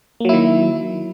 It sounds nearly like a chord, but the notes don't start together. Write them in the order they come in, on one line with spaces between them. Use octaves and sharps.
A#3 F#3 E4 D#3